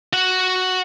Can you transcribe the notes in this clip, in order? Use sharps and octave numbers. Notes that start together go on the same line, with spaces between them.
F#4 F#5